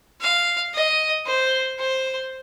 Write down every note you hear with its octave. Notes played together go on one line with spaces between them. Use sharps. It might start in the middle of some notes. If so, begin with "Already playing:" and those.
F5
D#5
C5
C5